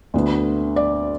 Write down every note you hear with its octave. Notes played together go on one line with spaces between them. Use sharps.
D2 D3 B3
D5